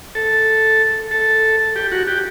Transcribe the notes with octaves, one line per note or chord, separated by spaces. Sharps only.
A4
A4
G4
F#4
G4